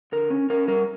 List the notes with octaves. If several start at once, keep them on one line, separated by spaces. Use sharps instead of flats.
D3 A#4
C#4
C#4 A#4
G3 A#4